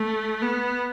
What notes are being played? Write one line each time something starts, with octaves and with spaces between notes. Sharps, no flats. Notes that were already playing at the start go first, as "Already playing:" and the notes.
Already playing: A3
B3